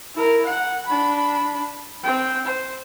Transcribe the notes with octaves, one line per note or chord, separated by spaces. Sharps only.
E4 A#4
F#5
D4 B5
C4 G5
C5